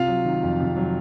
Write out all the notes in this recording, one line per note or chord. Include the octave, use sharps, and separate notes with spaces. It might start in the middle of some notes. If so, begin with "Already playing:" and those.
Already playing: C3 F4 F5
F#3
D#3
F2
C3
F#3